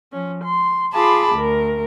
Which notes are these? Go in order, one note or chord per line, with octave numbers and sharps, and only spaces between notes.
F3 C#4
C6
F4 G#4 A5 B5 D6
D2 A#4